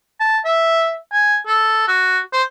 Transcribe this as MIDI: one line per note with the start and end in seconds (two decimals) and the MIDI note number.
0.20 0.39 81
0.45 0.96 76
1.12 1.38 80
1.47 1.88 69
1.88 2.19 66
2.33 2.43 72